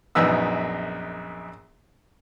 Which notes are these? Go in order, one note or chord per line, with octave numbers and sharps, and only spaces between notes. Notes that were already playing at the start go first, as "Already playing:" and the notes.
A#1 F#2 B3 D#4 E6